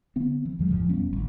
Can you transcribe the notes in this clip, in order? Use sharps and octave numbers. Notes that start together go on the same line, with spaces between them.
D3 B3 C4
E3
D#2 D3 F3 G#3
F1 F#2 A2 F3
E1 G3 B3 C#4
A1 D2